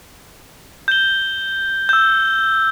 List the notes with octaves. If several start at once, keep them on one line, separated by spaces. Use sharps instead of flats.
G6 G7
E6 G6